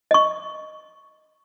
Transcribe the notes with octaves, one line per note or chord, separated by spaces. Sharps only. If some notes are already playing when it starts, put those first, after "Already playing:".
D#5 C#6